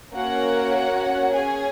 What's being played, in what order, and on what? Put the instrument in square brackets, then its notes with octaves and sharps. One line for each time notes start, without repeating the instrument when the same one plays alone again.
[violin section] A#3 C#4 F#4 C#5 F#5
C#4 G#4 C#5 G#5